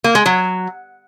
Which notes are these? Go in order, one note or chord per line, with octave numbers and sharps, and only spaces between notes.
A#3
G#3
F#3